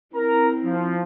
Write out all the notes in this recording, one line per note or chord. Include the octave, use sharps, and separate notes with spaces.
C4 E4 A#4 A#5
F3